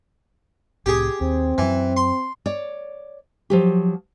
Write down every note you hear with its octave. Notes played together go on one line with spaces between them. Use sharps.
C2 A2 C4 G4 G#4
D#2 C4
F#2 E3 F#3
C6
C#5 D5
F3 F#3 G4